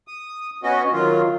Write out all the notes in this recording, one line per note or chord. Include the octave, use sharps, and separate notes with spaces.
D#6
B3 C#4 F#4 D#5
D#3 F#3 F4